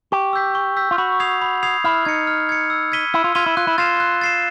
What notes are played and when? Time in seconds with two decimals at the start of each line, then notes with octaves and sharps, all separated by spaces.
0.12 G4 C#6
0.33 E6 G6 B6
0.55 C#6
0.76 E6 G6 B6
0.91 F4
0.98 F#4 B5
1.20 D#6 G#6 C7 F7
1.41 B5
1.63 D#6 G#6 C7 F7
1.84 E4 F6
2.05 D#4 G#6 C#7
2.27 F6
2.49 G#6 C#7
2.70 E6
2.92 G#6 B6 D#7 G7
3.14 E4 E6
3.24 F4
3.35 F4 G#6 B6 D#7 G7
3.46 E4
3.57 F4 F#6
3.67 E4
3.78 F4 A6 C7 E7
4.00 F#6
4.21 A6 C7 E7